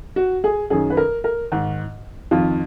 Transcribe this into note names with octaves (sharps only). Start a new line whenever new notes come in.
F#4
G#4
F#2 D#3 G#4
B4
A#4
A#4
G#2 D#3
F2 D#3 F4